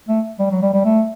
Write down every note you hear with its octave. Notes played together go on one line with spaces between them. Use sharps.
A3
G3
F#3
G3
G3
A3